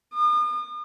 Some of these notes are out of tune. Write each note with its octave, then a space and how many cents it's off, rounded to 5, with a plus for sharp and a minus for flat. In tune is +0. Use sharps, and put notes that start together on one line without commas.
D#6 -40